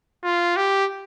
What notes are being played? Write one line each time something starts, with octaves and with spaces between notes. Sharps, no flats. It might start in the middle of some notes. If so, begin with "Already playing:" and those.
F4
G4